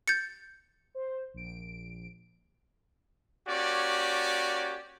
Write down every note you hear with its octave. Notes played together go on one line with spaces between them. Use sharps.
G6 A6 C#7
C5
A#1 D7
A#3 C#4 F#4 G4 C#5 D5